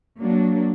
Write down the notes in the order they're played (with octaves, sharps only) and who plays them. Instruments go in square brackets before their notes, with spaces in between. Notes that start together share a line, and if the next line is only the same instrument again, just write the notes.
[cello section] F#3 A#3 D4